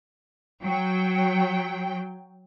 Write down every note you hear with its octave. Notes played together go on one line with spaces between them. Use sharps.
F#3 G5